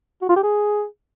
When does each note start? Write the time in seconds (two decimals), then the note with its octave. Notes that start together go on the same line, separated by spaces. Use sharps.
0.22 F#4
0.29 F4
0.36 G4
0.44 G#4